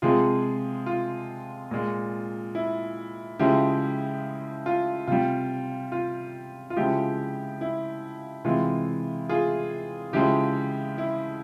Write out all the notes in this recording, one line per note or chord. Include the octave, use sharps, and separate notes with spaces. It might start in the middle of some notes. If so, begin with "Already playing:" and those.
C3 F3 G#3 F4 G#4
F4
A#2 G#3
E4
C#3 F3 G#3 E4 G4
F4
C3 G3 F4
F4
F4
C#3 F3 G#3 E4 G4
E4
C3 E3 G#3 F4
F4 G#4
C#3 F3 G#3 E4 G4
E4